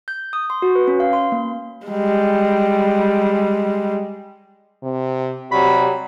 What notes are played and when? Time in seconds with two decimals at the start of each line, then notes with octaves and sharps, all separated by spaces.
0.08 G6
0.33 D#6
0.50 C6
0.62 F#4
0.75 B4
0.87 C#4
1.00 F5
1.13 C6
1.32 A#3
1.87 G3 G#3
4.83 C3
5.52 C3 F#3 G3 F#4 B5